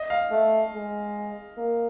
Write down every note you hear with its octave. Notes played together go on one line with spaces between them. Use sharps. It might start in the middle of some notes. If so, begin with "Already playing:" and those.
Already playing: D#5
F5
A3
G#3
A#3